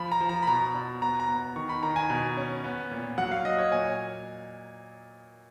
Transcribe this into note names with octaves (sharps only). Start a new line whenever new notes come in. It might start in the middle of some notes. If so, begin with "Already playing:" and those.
Already playing: F3 B5
A#5
F3
A#5
B5
B2 A#5
B2
B3 A#5
A#5
B3
D#3 C#6
B5
D#3 A#5
G#5
B2
C#4
B3
A#2
F#3 F#5
F5
F#3 D#5
C#5
A#2 G#5